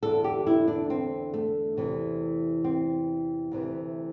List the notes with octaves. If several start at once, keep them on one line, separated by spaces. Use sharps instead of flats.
E2 D3 A4
G4
E4
D4
C4
A3
E2 C3 E3
C4
D2 C3 E3